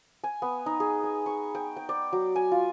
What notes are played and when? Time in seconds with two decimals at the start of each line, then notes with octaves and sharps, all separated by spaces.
0.24 G#5
0.42 B3
0.66 D#4
0.80 G#4
1.03 G#5
1.26 C#6
1.55 G5
1.77 G5
1.89 D5
2.12 F#3
2.36 G#5
2.52 F4